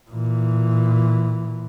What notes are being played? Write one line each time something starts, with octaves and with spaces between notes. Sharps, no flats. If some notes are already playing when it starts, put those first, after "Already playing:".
A#2 E3